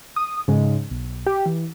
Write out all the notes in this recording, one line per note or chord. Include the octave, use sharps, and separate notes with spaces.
D#6
G#2 C#3 G#3
B1
G4
E3